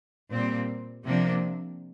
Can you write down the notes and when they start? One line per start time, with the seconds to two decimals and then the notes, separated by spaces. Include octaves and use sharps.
0.32 A#2 G3 C4
1.04 C3 F3 A#3 D4